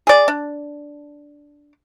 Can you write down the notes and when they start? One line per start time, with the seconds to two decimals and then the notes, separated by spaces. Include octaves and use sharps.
0.07 G#4 D5
0.28 D4